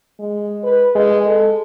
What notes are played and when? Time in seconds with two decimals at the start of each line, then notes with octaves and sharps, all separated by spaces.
0.20 G#3
0.64 B4
0.95 G#3
1.26 A4